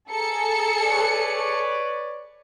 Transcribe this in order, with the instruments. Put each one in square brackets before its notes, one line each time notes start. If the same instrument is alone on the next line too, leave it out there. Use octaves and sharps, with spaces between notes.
[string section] G#4 A4 C#7 [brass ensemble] A#5
[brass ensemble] B4 C#5 D5